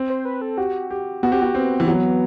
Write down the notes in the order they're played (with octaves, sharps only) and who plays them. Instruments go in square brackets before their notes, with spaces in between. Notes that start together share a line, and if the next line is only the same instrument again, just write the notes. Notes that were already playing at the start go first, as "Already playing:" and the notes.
Already playing: [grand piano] C4
[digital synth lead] C5
B4
A4
[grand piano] F#4 [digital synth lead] G4
[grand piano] G4
[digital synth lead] B3 [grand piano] F#4
[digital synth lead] C4 [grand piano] G4
[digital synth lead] B3 [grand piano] F#4
[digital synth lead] B3 [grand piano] C4
[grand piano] E3
F#3